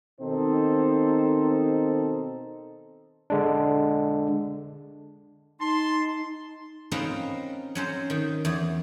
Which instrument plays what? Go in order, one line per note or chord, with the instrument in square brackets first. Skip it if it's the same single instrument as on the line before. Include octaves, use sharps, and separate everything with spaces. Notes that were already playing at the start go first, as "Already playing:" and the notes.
[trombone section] B2 D#3 C4 D#4 A4 C5
[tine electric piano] D3 G#3 D4
[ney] D#4 [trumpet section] A5 C6
[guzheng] C4 C#4 D#4 F4 A#4 B4
F#3 C#4 C5
D#3
E2